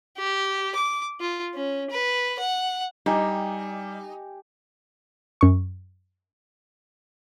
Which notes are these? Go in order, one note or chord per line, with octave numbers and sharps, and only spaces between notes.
G4
D6
F4
C#4
B4
F#5
G3 D#4 G4 G#5
F#2 C#6